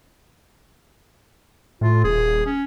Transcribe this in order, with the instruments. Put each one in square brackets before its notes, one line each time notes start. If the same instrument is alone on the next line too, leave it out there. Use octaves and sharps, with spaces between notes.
[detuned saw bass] A2 [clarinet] F4
[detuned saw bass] D#1 [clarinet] G#4
[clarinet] C#4